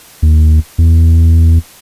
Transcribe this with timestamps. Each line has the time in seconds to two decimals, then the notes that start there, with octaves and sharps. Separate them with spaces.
0.22 D#2
0.78 E2